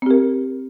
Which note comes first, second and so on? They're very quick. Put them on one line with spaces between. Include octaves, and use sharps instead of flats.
C4 G4 A#4